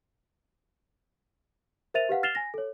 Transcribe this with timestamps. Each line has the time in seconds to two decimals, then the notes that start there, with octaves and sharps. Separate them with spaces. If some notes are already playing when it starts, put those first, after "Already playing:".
1.94 A#4 C5 E5 A6 D#7 F7
2.09 G4 B4 F5 F#5
2.23 F6 A6 C7 E7 F7 G7
2.35 G#5 A#6
2.54 A4 C#5